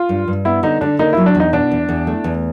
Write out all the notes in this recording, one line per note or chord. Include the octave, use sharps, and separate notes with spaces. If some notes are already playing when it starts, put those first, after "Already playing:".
Already playing: F4
G2
G2
B3 E4
D3 D#4
D3 D4
A#3 D#4
F#3 E4
D4
E2
D#4
B2 D4
E2
E2
A3
E2